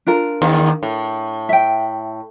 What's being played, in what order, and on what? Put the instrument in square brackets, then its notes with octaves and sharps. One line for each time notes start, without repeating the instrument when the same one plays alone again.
[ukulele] D4 F4 A#4
[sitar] D#2 D#3
A2
[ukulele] E5 G5